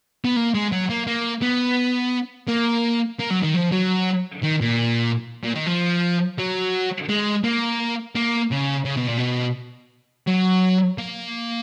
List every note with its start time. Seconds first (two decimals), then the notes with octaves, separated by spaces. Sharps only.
0.24 B3
0.36 A#3
0.54 G#3
0.72 F#3
0.90 A#3
1.07 A#3
1.42 B3
2.48 A#3
3.20 A#3
3.31 F#3
3.43 D#3
3.55 F3
3.72 F#3
4.43 D#3
4.61 A#2
5.44 A#2
5.55 D#3
5.67 F3
6.38 F#3
7.09 G#3
7.44 A#3
8.15 A#3
8.51 C#3
8.85 C#3
8.97 B2
9.08 A#2
9.19 B2
10.27 F#3
10.98 A#3